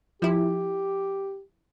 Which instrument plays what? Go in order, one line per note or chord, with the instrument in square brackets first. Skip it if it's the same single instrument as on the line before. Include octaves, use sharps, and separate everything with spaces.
[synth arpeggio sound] F3 E4 [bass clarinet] G4